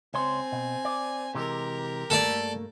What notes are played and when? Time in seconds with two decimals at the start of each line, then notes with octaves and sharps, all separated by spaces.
0.14 C#2 C4 C#5 G#5 C6
0.52 B2
0.85 D5
1.35 C3 E3 G#3 G4 A#4
2.10 G2 A3 A#3 A4 D5